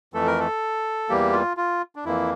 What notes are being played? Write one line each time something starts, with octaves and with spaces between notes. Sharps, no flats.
F2 E3 A3 A4
A#4
A4
E2 E3 G3 A#3 G4
F4
F4
D4
F2 E3 A#3 E4